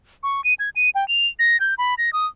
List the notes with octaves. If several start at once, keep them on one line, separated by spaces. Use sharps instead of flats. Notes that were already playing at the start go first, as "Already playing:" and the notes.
C#6
D#7
G#6
D#7
G5
F7
A#6
G6
B5
A#6
D#6